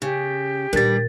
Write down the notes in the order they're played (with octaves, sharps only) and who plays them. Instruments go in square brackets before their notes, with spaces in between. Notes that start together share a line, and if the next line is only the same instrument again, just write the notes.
[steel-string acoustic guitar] C#3 [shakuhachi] G4
[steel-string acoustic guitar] G2 G3 [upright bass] A#2 D#3 [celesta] A#4 A6